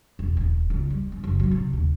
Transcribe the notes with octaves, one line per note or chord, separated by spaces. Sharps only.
E1
D#1
C#2
G3
C#4
F#1
F#3
C3
D#2